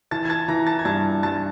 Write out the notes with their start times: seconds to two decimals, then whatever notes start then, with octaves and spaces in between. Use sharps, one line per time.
0.11 E3 A5 A6
0.25 G#6
0.29 A5 A6
0.48 E3 A#5 A#6
0.67 A5 A6
0.79 G#6
0.85 G2 A5 A6
1.23 G2 A5 A6